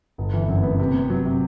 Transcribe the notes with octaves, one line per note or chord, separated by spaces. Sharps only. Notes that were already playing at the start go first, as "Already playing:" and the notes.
G1
E3
F#2
B3
C3
B3
F#3
C3